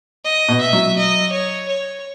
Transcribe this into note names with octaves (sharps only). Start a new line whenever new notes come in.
D#5
B2
E5
F#3
D#5
C#5
C#5